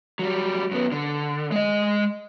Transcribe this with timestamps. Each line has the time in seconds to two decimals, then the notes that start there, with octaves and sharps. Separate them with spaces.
0.19 F#3 G3
0.71 F#2 B3
0.92 D3
1.52 G#3 D#5